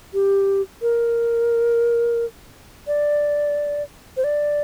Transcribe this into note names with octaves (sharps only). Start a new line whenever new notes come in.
G4
A#4
D5
C5
D5